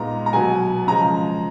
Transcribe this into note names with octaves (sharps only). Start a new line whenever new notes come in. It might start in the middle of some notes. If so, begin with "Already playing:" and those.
Already playing: A#2 G#3 B3 D#4 A#5
A#5
B2 F#3 B3 G#5
C#3 F3 G#3 A#5